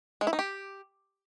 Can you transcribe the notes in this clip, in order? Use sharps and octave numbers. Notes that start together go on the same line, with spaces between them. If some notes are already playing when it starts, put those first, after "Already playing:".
G#3
E4
D#4
G4